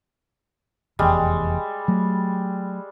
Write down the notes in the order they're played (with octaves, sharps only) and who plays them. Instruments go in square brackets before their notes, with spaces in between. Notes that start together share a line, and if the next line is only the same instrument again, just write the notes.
[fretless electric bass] F1 E2 [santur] G3 G#3
[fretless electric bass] F#3 A3